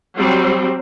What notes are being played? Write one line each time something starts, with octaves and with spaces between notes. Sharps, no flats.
F#3 G3 C4